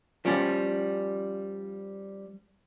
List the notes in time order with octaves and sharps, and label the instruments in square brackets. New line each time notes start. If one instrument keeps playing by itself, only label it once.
[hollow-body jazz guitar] F3 G3 C#4